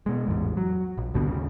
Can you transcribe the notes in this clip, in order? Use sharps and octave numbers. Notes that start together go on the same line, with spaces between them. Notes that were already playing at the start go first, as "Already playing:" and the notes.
B2 G#3
A1 E2 G#2
F#3
A#1
G#1 D2 B2 D3
D#2 C#3